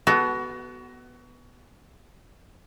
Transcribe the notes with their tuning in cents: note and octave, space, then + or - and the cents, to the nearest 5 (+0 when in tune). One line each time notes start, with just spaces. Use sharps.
B3 +0 F#4 +25 A4 -20